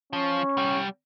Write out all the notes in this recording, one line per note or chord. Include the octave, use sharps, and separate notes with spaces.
F3 C#4
C2 G3